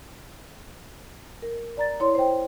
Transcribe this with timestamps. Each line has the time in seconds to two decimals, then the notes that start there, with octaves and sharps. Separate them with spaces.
1.42 A#4
1.77 D5 A#5 A6
2.00 E4 C#5 C6
2.15 C5 G5